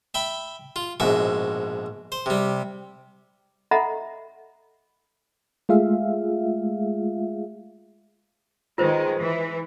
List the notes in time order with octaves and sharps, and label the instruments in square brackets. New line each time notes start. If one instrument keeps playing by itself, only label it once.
[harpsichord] E5 G5 B5
F4
A#1 G#2 B2 E5
C5
C3 G3
[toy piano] A4 D#5 E5 F#5 A#5 B5
[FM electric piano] G#3 A3 F4 G#4 E5 F5
[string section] D#3 G#3 [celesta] F4 B4 C5
[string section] E3